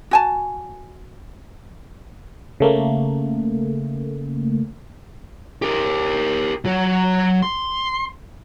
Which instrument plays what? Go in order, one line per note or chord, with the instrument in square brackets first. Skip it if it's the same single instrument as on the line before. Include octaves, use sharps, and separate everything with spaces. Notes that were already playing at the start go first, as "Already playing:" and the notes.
[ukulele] F#4 G#5 A5
[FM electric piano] C#3 A3 A#3
[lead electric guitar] G4 A#4
F#3 F#4
C6